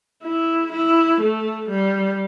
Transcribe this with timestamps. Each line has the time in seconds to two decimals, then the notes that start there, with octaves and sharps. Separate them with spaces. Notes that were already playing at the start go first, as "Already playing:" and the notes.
0.23 E4
0.73 E4
1.21 A3
1.70 G3